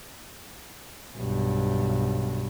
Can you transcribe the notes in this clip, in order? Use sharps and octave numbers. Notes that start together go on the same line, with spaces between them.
B1 G2